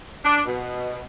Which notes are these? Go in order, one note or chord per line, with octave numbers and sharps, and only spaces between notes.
D4
B2